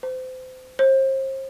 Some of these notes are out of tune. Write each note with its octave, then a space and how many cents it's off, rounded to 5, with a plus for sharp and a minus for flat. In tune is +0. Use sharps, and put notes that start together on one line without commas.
C5 -30
C5 +35